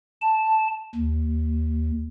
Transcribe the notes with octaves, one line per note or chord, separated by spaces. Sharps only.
A5
D#2